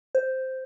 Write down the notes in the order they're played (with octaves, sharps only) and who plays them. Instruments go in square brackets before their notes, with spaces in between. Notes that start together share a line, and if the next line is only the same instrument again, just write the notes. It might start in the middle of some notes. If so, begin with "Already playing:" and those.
[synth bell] C5